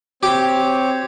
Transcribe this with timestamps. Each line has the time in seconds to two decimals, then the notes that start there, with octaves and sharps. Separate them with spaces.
0.23 C4 G4 C#5